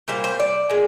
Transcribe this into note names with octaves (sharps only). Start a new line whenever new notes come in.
A#2 G3 A#3 C5
C5
D5
A#2 G#3